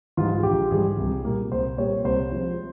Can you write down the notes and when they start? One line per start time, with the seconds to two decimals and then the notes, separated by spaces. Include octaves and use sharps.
0.17 G#2 E3 G3 F4
0.38 G#4
0.43 A#1 G4
0.71 G#2 E3 G3 G#4
0.98 C2
1.25 A#2 G3 A#3
1.52 C2 C5
1.77 A#2 G3 A#3 C#5
2.04 C2 C5
2.31 C3 F3 G#3